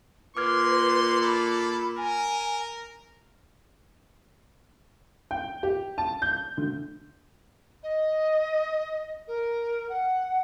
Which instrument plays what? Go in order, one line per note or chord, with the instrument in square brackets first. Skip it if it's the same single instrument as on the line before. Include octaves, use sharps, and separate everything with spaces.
[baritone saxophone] A#2 [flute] B4 [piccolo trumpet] C6 [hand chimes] D6 F6 G#6
[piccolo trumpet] A4 [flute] B5
[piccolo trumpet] A#4 [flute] G#5
[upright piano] G5
G4
A5
G6
D2
[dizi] D#5
A#4
F#5